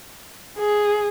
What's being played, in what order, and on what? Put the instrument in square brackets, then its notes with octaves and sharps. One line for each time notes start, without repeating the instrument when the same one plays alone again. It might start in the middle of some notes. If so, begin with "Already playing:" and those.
[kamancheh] G#4